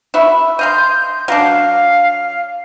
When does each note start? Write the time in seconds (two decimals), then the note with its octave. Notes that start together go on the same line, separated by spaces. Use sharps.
0.14 E4 F#4 E5
0.59 D#5 F5 C6 G6
1.28 F#3 D4 F5